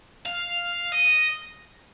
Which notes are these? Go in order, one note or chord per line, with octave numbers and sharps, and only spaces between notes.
F5
D#5